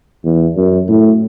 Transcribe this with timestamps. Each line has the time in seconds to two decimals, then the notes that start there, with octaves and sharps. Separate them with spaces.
0.24 E2
0.57 F#2
0.89 A2